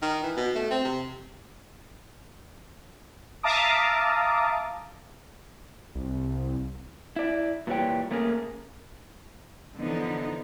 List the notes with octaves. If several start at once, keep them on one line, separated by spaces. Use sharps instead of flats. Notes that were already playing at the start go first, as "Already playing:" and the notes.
D#3
E3
B2
A3
C4
C3
E5 F5 A5 A#5 D6 D#6
C2
E4 D5
A#2 E3 G3 C#5 G5
A3 A#3 C#4 G#4 A#4
D3 E3 F3 B3 D#4